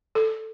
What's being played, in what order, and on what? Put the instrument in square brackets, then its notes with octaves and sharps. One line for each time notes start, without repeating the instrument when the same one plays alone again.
[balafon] A4